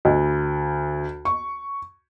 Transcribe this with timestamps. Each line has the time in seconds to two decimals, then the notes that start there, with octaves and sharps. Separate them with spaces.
0.05 D2
1.25 C#6